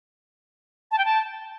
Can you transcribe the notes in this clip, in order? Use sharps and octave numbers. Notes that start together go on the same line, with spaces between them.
A5
G5
A5